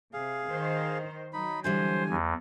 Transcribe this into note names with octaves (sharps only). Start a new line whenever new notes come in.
C3 G#4 F5
D#3 C5
F#3 D#4 B5
D3 E3 G3 C5 G#5
E2